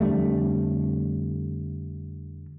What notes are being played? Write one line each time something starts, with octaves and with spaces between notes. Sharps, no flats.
F2 D3 G3 A3